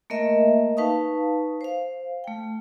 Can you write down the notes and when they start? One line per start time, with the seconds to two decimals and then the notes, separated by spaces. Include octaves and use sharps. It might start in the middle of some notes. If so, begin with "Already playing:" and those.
0.10 A3 A#3 A#4 D#5 E5
0.77 D#4 B4 F5 A5 C#6 D#6
1.61 C5 F5
2.24 A3 G5